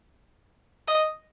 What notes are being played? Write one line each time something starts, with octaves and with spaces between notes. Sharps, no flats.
D#5